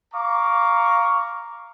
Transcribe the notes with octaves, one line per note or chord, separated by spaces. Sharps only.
F5 A#5 C#6 D6